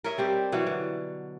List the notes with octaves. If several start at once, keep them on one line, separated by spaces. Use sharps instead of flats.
A#4 C#5 D#5 E5
G3 C4 G4
B2 E3 F#3
D3